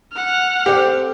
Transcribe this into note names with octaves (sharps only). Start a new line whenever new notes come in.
F#5 F6
C4 G4 A4 D5